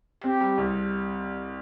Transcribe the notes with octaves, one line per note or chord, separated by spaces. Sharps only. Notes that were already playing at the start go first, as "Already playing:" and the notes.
C4 G4
G3
C2